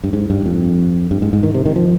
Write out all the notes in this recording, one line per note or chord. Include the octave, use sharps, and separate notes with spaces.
G2
G#2
G2
F2
G2
G#2
G#2
D#3
C3
D#3
F3